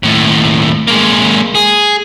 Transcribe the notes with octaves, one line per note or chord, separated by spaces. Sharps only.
D#2 A2
G#3 A#3
G#4